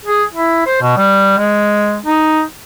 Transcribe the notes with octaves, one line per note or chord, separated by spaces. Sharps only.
G#4
E4
C5
B2
G3
G#3
D#4